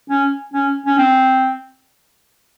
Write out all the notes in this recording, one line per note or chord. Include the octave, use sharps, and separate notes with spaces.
C#4
C#4
C#4
C4